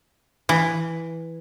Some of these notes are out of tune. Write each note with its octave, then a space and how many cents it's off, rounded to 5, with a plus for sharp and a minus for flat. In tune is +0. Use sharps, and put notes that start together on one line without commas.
E3 +0